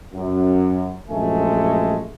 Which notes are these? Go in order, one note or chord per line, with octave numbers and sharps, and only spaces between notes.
F#2
A#1 F#2 G#3 A3 G#5